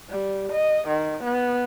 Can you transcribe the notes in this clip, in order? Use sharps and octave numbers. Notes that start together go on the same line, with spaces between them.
G3
D#5
D#3
B3